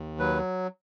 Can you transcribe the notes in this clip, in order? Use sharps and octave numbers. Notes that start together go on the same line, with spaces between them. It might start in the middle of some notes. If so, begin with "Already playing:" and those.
Already playing: D#2
F#3 B4